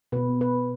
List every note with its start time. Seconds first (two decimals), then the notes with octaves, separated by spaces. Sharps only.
0.12 B2 B3 B4
0.41 B4